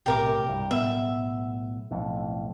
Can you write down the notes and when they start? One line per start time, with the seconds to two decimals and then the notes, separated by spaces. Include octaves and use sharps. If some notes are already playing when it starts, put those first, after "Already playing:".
0.06 B1 A2 C3 G4 A#4 D6
0.47 C2 G2
0.71 B1 A2 B3 E5
1.90 B1 F2 A2